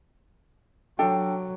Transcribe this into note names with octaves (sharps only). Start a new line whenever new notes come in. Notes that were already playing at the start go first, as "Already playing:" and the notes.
F#3 D4 A4 G5